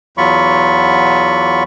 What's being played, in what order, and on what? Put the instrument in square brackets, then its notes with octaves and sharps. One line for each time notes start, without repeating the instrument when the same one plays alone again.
[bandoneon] E2 F#3 F4 B5 C#6